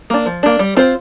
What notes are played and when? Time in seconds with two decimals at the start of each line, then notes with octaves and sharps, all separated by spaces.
0.10 A#3 D4
0.26 F3
0.43 A#3 D4
0.59 G3
0.77 C4 F4 C5